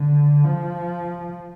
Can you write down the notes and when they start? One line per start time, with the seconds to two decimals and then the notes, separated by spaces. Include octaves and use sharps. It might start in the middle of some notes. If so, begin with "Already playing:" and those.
Already playing: D3
0.44 F3